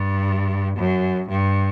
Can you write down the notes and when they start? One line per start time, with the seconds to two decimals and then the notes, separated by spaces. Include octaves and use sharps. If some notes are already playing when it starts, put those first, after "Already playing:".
Already playing: G2
0.77 F#2
1.29 G2